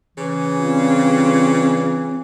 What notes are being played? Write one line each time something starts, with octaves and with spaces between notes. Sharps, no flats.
C#3 E3
G2 C4 D4 F4